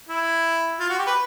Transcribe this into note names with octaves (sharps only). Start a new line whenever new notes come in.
E4
F4
F#4
G4
B4